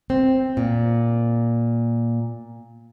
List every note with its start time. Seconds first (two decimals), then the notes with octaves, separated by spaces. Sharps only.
0.10 C4
0.57 A#2